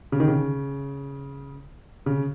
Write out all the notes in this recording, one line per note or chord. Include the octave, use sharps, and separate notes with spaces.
C#3
D#3
C#3
C#3